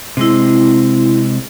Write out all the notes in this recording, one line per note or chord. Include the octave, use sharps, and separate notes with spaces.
C3 G#3 C4 E4